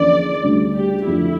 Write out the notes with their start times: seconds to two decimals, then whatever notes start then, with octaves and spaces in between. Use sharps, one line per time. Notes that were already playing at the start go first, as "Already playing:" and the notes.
Already playing: E2 D3 F3 A#3 C#4 D5
0.43 D2 C#3 G3
0.75 G4
1.06 F2 D3 A3 E4